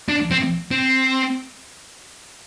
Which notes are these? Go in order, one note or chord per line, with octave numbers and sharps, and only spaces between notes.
D4
C4
C4